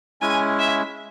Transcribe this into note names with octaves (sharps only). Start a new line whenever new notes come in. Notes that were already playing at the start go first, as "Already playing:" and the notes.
G#3 C#4 E4 G#5
E5